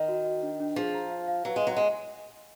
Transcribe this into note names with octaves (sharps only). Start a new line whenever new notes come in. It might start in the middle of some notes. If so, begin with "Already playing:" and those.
Already playing: D#3
F#4
F#4
D4
D4
F3 G#4
A#5
F5
F5
F#3 B4
G#3
F#3 D#5
G#3